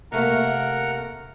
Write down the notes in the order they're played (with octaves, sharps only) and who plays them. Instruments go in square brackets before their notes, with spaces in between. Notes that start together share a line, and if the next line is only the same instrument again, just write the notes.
[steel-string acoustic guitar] C3 A3 A#3 [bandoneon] A#4 F#5 A#5